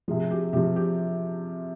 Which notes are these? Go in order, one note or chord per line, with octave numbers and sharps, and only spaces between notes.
C3 F3 G#4
G4
C3 F3 G4
G4